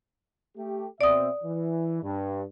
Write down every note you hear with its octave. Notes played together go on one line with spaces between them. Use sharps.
A3 G4
B2 C4 D5 E5 D#6
E3
G2